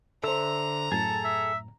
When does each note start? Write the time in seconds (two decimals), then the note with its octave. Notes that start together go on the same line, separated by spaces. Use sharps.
0.24 D3 A4 C5 E5 A#5
0.92 F#2 A2 G#4 A4 A5
1.25 E5